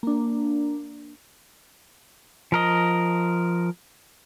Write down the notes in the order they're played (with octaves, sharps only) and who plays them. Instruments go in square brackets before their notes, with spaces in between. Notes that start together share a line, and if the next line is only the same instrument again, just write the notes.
[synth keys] A#3 D4
[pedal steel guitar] F3 A#4 D#5